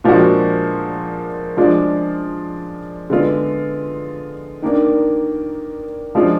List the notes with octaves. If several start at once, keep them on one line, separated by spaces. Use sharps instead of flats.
A#2 F3 G#3 D4 F#4
F3 G#3 D4 F4
D3 G#3 B3 F4
D#3 A#3 D4
F3 G#3 D4 F4